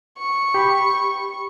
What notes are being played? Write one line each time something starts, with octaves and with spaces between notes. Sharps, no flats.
C#6
G4 B5